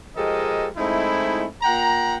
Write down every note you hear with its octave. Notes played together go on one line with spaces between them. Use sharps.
F3 G#3 G4 A4 A#4 D#5
G#3 A3 C4 D#4 E4
A#2 F#5 G5 A#5